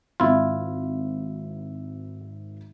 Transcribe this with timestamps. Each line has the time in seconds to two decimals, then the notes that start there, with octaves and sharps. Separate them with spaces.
0.20 G#1 E4 F4 E5